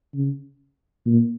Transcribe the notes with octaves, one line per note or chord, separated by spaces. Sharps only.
C#3
A#2